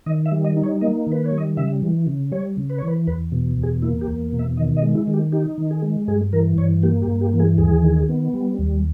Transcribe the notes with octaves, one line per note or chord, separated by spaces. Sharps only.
D#3 D#5
E5
G3
D#5
D#4
C#5
A#3 D#5
D#3 B4
C#5
G3
D#5
C#3 E5
E3
C#3
G3 C#5
C#3
B4
C#5
E3
B4
E2 B4
B2
E2
G#4
A#3 E4
G4
E2
B2
E5
D#3 D#5
D#5
G#3
E4
D#3
G4
D#4 G4
D#3
G#4
G#3
G2 G#4
E3 A#4
G2 C#5
A#3 G4
G4
G2
G4
E3
G#4
D#2 G#4
D#3
B3
G3
D#2